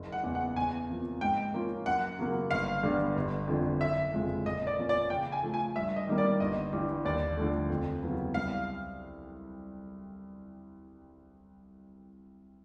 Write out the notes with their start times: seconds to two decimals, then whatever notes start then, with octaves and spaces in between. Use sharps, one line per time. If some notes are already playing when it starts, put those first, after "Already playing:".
Already playing: F#1
0.12 F#5
0.23 E2 C#3
0.35 F#5
0.56 E2 G#5
0.89 C3 F3 A#3
1.21 G#2 G5
1.53 F3 A#3 C#4 F4
1.86 F#2 F#5
2.19 C#3 F#3 A#3
2.50 G1 F5
2.83 G2 D3 G3 B3
3.16 G1
3.48 F2 D3 F3
3.81 F#1 E5
4.13 F2 C#3 F3 G#3
4.46 A#2 D#5
4.67 D5
4.78 F3 A#3 C#4
4.89 D5
5.10 C#3 G5
5.32 G#5
5.43 F3 A3
5.54 G#5
5.75 G2 E5
5.96 D#5
6.07 D#3 G3 A#3
6.18 D5
6.40 G1 D#5
6.72 G2 E3 G3
7.05 D#2 D5
7.37 D3 F3 A3
7.70 F2
8.02 C#3 F#3 B3 E4
8.34 C2 F5